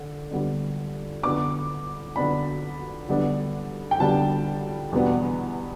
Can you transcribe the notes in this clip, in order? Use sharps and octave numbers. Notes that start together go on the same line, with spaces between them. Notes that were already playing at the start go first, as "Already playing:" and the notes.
Already playing: D3
D3 G3 B3 D4
D3 B3 D4 D6
D3 B3 D4 B5
D3 G3 B3 D4
G5
D3 G3 B3 D4 A5
E2 B2 G3 B3 D4